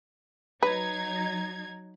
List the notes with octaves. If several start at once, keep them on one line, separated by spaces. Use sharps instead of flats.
F#3 D#4 B4 G#6